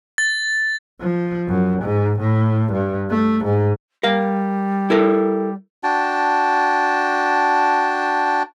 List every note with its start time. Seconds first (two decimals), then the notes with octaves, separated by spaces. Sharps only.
0.18 A6
1.00 F3
1.48 F#2
1.82 G#2
2.19 A2
2.72 G2
3.10 A3
3.44 G#2
4.03 G3 A#4 F5
4.90 E4 A4 A#4
5.83 D4 F#4 G5 A5